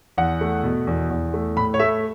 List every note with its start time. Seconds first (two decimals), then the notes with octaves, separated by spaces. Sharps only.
0.18 E2 F#5
0.41 A3
0.64 B2
0.87 E2
1.11 E2
1.34 A3
1.57 A2 B5
1.74 C#5
1.79 A3 E5